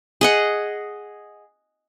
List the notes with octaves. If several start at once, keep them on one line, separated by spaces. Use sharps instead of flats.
G#4 D#5 F#5